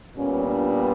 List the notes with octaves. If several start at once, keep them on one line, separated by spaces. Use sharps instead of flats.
A#2 G3 B3 C#4
D4